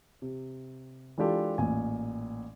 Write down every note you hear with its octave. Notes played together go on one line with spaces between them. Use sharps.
C3
E3 G#3 D4 F4 G4 A4
A1 A#2 G#5